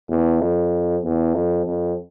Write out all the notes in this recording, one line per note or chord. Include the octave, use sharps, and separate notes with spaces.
E2
F2
E2
F2
F2